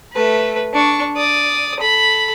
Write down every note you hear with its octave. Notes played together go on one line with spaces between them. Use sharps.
A3 B4
D4 C#6
D5 D#6
A4 B5